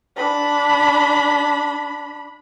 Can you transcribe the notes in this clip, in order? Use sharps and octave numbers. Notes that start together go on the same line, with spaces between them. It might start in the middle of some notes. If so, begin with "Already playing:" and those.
D4 B5